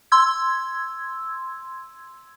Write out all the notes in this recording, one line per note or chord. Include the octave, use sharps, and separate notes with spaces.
C6 E6 G#6